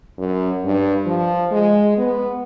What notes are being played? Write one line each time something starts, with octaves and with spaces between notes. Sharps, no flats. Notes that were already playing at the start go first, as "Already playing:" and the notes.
F#2
G2
F3
G#3
B3